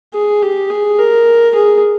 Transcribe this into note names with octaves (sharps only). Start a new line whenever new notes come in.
G#4
G4
G#4
A#4
G#4